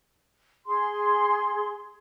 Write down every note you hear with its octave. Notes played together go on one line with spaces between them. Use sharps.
G#4 C6